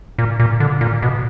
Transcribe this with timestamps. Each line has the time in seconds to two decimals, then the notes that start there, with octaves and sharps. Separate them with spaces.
0.18 A#2
0.40 A#2
0.60 D3
0.81 A#2
1.02 B2